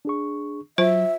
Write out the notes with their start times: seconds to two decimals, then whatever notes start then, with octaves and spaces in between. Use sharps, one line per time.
0.05 D4 G#4 C#6
0.78 F#3 F4 C5 E5